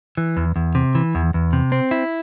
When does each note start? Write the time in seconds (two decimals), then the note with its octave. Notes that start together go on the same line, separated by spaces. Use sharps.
0.17 E3
0.37 E2
0.56 E2
0.75 C3
0.95 E3
1.15 E2
1.34 E2
1.53 C3
1.72 C4
1.91 E4